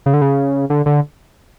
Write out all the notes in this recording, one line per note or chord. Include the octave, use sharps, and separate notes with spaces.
C#3
D3
C#3
D3
D3